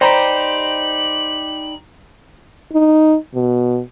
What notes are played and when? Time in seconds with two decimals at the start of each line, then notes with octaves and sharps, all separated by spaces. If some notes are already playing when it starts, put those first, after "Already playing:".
0.01 D#4 G4 C5 D5 G5 A#5 B5 F#7
2.73 D#4
3.34 B2